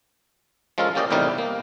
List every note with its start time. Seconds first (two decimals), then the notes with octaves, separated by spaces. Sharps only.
0.78 F3 G#3 C#4 F4 A4 A#4
0.95 A#3 C#4 G4 D5 D#5 G5
1.11 E2 A2 C3 G3 D#4 A#4
1.38 A#3